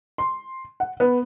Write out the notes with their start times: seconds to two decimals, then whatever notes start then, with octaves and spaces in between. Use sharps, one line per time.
0.18 C6
0.80 F#5
1.00 B3